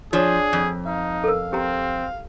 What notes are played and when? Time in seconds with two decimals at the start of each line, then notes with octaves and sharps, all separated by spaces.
0.13 F3 D4 F4 G#4 C#5
0.53 F2
0.86 D#4 F5
1.24 A4 A#4
1.53 C4 G4 A#5